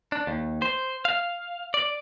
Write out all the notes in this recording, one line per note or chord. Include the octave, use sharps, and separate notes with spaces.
D4
D#2
C5
F5
D5